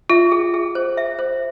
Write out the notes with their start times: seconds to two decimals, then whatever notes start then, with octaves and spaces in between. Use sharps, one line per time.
0.10 F4 E5
0.32 G#4
0.54 G#4
0.75 C5
0.97 E5
1.19 C5